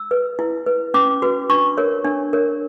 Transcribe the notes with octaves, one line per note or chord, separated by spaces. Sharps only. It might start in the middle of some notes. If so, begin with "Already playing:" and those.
Already playing: E6
B4
E4
B4
C#4 D6
F#4 B4
D4 C#6
A#4 C#5
D4
A#4 C#5